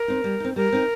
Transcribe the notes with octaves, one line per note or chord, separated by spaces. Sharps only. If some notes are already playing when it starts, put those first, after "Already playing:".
Already playing: A#4
C4 D#4
G3
C4 D#4
G3 A#4
C4 D#4